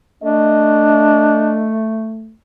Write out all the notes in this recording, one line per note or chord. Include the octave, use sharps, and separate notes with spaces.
A3 D4 D#5